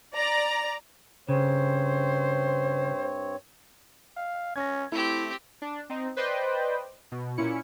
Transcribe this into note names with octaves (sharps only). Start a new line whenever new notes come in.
D5 A#5
G2 C#3 C4 C5 C#5
F5
C#4 G#6 A#6
A3 C4 E4 G4
D4
C4 D#4
B4 C5 D5 D#5 G5
B2
A#2 C#4 E4 C#7